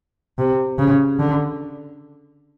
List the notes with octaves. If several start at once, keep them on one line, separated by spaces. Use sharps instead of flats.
C3
C#3
D3